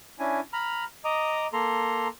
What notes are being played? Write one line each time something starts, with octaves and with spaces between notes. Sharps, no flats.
C#4 D4 E4 G#5
A#5 B5 F6
D#5 A#5 D6 D#6
A#3 A4 A#5 C6